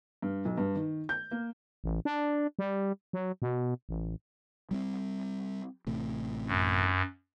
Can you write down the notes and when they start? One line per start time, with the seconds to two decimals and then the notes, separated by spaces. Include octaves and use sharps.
0.22 G2
0.45 B1
0.58 G2
0.75 D#3
1.09 G6
1.31 A#3
1.84 A1
2.05 D4
2.59 G3
3.13 F#3
3.42 B2
3.89 A1
4.71 G3 A#3 C4
5.87 A1 A2 C3
6.47 F#2